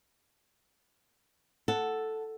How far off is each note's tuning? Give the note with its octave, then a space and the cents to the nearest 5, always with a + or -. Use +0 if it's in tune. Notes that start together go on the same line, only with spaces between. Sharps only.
A4 +0 F#5 +0